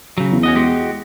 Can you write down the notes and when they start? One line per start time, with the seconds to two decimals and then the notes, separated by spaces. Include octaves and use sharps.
0.18 C#3 F#3
0.31 E2
0.43 C#4 F#4 D#5
0.55 G#3 F#4 G4